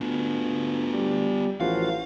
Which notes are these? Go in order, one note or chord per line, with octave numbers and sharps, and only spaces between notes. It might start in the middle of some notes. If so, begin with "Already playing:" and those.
D2 B3 F4
G3
A1 F3 F4 F#4 F5